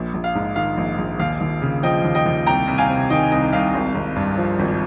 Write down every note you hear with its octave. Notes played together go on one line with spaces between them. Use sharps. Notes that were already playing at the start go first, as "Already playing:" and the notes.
Already playing: A#1
A#1
F5
G#2
D#3 F5
A#1
A#1
D#2 F5
D#2
C#3
F3 D#5 G5
D#2
D#5 G5
D#2
C2 G5 A#5
C2
F5 G#5
C3
D#3 D#5 G5
C2 D#5
C2 F5
G#1
G#1
G2
F3
G#1